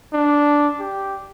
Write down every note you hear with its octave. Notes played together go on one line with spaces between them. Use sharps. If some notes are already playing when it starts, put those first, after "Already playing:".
D4
G4